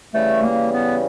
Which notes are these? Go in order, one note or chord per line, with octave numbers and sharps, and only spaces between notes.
C#3 E3 G3 A3
A#3
B3